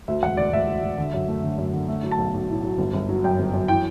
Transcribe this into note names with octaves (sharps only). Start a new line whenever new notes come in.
D2 E5
E1 F#5
D2 D5
D2 E5
D2
D2
D3
F#2
A3
D3
F#2
D3
A3
F#3
A5
B1
B1
A2
F#3
G1
G1
F#3
F#2 G5
G1
F#2
E3 G5